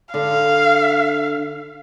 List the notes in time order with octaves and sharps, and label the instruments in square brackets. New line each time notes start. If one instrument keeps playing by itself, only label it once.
[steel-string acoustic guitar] D3 [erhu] F5